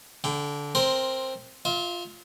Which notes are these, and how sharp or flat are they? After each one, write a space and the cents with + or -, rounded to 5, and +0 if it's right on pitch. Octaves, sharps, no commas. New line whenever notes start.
D3 -20 G5 +0
C4 +10 A#4 +0 C6 +0
F4 +0 E5 -35